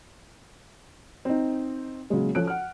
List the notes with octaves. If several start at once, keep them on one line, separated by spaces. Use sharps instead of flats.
C4 D#4
A#2 C#3 F#3 G#3
F3 C#4 A4 F#6 D7
F#5 F6